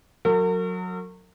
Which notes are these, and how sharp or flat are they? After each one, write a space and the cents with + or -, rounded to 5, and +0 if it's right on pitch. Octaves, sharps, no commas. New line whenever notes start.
F#3 -20 A#4 -45